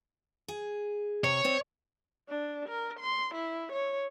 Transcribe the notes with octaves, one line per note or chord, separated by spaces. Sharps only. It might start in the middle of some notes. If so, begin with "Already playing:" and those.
G#4
C3 C#5
C4 C5 D5
D4
A#4
C6
E4
C#5